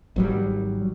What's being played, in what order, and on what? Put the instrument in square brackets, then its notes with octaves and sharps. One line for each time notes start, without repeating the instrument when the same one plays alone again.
[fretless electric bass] G#1 F#3 G3